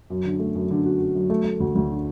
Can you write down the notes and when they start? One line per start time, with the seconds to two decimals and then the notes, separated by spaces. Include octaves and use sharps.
0.10 F#2
0.25 D3
0.40 A3
0.55 F#2
0.70 D3
0.85 F#4
1.00 F#4
1.15 F#2
1.30 A3
1.44 A3
1.60 D2
1.75 D2
1.90 D3